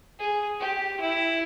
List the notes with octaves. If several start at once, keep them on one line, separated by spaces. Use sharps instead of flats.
G#4
G4
E4